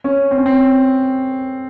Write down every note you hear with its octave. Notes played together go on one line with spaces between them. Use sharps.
C#4
C4
C#4
C4